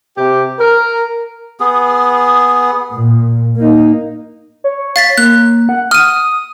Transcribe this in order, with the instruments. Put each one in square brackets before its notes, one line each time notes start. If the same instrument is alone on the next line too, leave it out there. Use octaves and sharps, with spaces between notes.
[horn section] C3 G4
A#4
[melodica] B3 G#4
[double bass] A#2
A#3 D#4
[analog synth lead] C#5
[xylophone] F5 A6 B6
[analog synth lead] A#3 [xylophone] F#6
[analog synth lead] F#5
[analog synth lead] D#6 [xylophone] F6 D#7